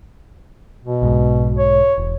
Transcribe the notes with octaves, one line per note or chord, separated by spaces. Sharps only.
B2
B1 G#2
C#5
E1